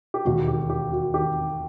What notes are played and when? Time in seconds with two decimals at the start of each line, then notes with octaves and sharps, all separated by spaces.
0.14 G4
0.25 E1 D#2 D#3 F#4
0.48 G4
0.70 G4
0.92 F#4
1.14 D#3 G4